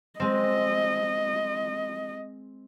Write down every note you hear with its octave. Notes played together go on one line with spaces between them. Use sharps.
G#3 C4 D#5